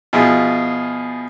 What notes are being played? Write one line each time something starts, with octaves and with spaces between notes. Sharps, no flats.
B2 F3 E4 F4 G#4